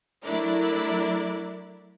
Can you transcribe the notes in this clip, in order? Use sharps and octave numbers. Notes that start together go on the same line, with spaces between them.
F#3 A3 D4 E4 A#4 D5